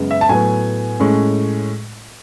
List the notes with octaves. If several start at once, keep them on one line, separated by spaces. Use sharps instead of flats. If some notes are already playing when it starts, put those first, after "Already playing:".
Already playing: F#2 C#3 G#3 B3
E5
A5
A2 F#3 B3 G#5
A2 G#3 C#4